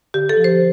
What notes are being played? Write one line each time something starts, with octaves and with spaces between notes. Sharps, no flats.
D3 G4
A4
F3
C5